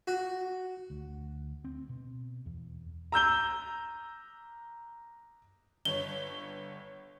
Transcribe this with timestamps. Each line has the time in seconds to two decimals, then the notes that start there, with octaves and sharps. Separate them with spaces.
0.07 F#4
0.90 D2
1.64 C4
1.89 B2
2.46 E2
3.12 A#5 E6 G6 G7
5.85 G1 C#5 G7